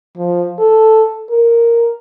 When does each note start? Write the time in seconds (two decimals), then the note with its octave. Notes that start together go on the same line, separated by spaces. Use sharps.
0.17 F3
0.58 A4
1.29 A#4